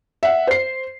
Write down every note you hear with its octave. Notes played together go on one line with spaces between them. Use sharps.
E5 F#5
C5 C7